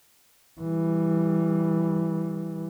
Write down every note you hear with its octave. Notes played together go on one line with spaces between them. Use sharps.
E3 G3